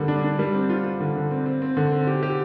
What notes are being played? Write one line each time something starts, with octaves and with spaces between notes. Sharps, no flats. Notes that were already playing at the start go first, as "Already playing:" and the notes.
Already playing: D3 G3 A#3
D4
D4
G3
C4
F4
F4
D3
D3
C4
C4
C4
D3
C4
G4
G4